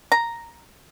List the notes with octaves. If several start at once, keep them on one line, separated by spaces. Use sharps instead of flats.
A#5